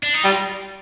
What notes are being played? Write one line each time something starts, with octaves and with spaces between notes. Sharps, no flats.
D4
D#4
G3 F4